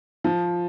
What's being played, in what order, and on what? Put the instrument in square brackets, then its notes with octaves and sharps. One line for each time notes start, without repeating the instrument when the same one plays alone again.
[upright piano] F3